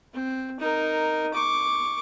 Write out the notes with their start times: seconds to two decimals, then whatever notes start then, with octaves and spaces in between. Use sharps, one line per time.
0.13 C4
0.60 D#4 A#4
1.34 C#6 D6